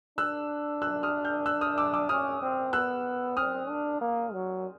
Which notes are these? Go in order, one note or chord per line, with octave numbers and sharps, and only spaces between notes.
D4 E6 F#6
E6 F#6
D#6 F6
F6 G6
E6 F#6
D#6 F6
D6 E6
D6 E6
C#4 D#6 F6
C4
B3 E6 F#6
C4 D#6 F6
D4
A#3
F#3